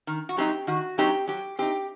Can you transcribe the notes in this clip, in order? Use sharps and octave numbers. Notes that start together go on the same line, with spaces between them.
D#3
F#4
F#3 C4 D#4 G4
D#3 F#4
F#3 C4 D#4 G4
F#3 G4
C4 D#4 G4